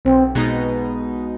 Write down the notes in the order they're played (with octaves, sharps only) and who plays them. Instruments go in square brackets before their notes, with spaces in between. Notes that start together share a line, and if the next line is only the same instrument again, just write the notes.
[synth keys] B1 [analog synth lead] C4
[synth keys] B2 G#3 B3 D#4